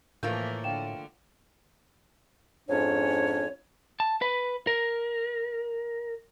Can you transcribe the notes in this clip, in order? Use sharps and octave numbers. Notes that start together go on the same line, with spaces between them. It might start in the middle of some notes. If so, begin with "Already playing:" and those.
A2 E3 F3 A3 A#3 F4 A#4 G6
D3 F5 G5 E7
F2 G#2 C#4 D4 C#5
A5
B4
A#4